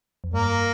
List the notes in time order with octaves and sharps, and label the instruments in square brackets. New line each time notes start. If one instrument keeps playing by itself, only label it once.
[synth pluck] F2
[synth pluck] G2 [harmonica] A#3